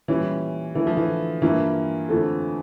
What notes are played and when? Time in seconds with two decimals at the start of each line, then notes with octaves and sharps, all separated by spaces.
0.08 A#2 E3 G3 C#4
0.75 D3 E3 A3 E4
0.87 F3
0.97 E3
1.42 G2 E3 F3 A#3 E4
2.09 F2 D3 F3 A3 E4